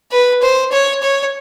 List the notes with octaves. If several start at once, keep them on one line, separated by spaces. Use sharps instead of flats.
B4
C5
C#5
C#5